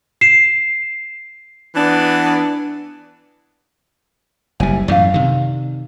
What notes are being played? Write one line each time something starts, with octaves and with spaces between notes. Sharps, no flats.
C7 E7
E3 B3 D4
F#1 G3 E4 G#5
F#2 A2 E3 D5 F5
C3 D#3